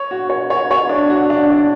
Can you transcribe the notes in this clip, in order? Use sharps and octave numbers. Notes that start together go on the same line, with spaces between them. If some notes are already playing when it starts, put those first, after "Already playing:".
Already playing: C#5
F#4
C#5
C#5
C#5
D4
F#4
D4
D4